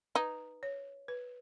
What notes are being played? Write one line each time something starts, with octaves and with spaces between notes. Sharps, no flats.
D#4 B4
C#5
B4